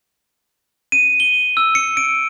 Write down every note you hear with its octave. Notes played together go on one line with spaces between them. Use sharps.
D#7
G7
E6
C#7
D7